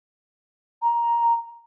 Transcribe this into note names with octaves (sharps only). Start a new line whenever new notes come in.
A#5